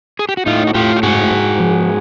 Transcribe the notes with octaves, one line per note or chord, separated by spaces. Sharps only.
G#4
G4
F#4
A2 D#4 F4
F#4
A2 F4 G4
G4
G#2 F#4 G#4
G#2
F3